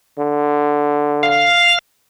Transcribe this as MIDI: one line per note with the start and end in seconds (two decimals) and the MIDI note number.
0.19 1.54 50
1.23 1.79 77